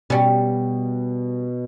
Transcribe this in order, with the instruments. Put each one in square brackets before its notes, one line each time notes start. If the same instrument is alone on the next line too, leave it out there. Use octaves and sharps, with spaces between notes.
[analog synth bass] B2 [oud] G3 C#4